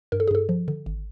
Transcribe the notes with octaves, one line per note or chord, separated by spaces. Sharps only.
G2 A#4
A4
G#4
G2 A4
F3
D3
G#1